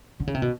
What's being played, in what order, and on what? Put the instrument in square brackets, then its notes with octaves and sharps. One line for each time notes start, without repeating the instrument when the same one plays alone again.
[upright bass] D3
C#3
C3
B2